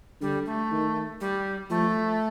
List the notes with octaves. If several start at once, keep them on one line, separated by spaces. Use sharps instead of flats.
D3 G3
A3
D#3
G3
F3 A3